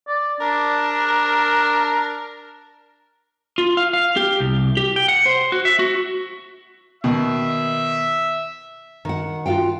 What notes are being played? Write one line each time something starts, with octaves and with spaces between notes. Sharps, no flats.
D5
D4 A#4
F4
F5
F5
G4
C2
G4
G5
F#5
C5
F#4
E5
F#4
B2 D#3 E5
D#3 F#5
F4 F#4 A4 F5 G5